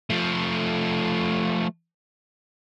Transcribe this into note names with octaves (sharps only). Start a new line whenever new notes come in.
F3 A3